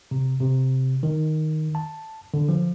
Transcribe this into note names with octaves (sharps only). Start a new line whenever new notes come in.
C3
C3
D#3
A5
D3
F3